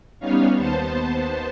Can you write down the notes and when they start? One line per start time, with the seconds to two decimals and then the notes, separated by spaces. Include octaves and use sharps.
0.20 G3 B3 C#4 D#4 C#5 F5
0.57 D#2 B3 C5 A5